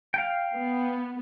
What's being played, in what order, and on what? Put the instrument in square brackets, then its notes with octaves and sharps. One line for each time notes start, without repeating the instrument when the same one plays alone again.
[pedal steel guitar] F5 G5
[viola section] B3